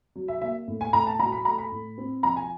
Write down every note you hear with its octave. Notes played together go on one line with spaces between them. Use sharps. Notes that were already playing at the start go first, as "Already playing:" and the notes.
F#3
E5
A#3 E5
A2
G#5
A2 A#5
A5
F#3 A#5
B5
A3 A#5
B5
A2
C4
F3 A#5
G#5